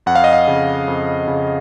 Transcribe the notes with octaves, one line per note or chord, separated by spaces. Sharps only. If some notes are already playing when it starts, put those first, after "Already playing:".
F2 F#5
F5
D#5
F5
C#3
F2
C#3